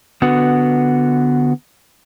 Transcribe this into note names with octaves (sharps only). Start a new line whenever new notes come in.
D3 B3 F#4